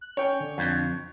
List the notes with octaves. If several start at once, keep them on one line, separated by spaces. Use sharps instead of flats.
F#6
C#4 C#5 G5
D3
F2